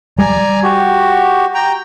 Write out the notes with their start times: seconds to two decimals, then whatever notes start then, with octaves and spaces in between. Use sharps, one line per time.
0.19 G3 D5 G#5 A#5
0.63 F#4 G4
1.54 G5 A#5